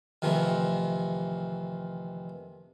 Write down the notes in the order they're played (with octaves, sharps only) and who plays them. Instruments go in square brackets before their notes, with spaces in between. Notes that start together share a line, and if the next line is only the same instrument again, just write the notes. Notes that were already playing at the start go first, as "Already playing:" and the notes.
[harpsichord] F2 C3 D#3 E3 A3